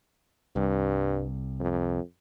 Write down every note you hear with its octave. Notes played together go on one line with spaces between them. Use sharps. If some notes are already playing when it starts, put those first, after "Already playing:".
C2 G2
F2